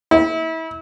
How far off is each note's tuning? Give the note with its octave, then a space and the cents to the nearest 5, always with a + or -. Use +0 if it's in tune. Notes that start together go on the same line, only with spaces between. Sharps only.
E4 -30